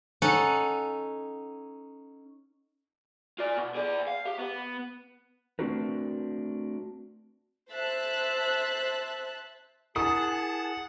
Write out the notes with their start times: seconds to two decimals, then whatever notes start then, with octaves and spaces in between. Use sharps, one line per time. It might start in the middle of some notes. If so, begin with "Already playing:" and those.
0.22 C#4 D#4 A4 F#5
3.38 F4 D5
3.56 B2
3.75 G#4 D5
4.07 F5
4.25 G4
4.38 B3
5.59 A3 C4 D4 F#4 A#4 B4
7.71 C5 E5 A5 F#6
9.96 E4 G#4 A#4 F#5 A5 A#5 D#6